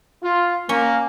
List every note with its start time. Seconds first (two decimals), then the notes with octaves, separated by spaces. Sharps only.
0.23 F4
0.69 A#3 C#4